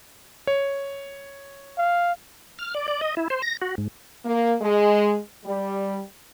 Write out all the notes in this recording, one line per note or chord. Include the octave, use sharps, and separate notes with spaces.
C#5
F5
F6
D5
D5
D#5
E4
C5
A#6
F#4
G#2
A#3
G#3
G3